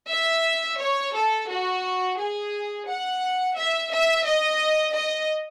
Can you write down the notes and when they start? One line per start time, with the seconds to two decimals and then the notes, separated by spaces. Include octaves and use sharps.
0.10 E5
0.80 C#5
1.16 A4
1.50 F#4
2.18 G#4
2.88 F#5
3.57 E5
3.93 E5
4.27 D#5
4.96 D#5